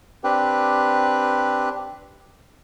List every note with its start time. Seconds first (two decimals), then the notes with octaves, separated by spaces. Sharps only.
0.24 C4 D4 G4 B4